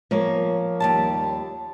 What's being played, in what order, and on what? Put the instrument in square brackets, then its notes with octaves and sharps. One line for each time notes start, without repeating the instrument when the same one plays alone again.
[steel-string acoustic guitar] F3 A#3 C#5
[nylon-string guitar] D#2 G3 A5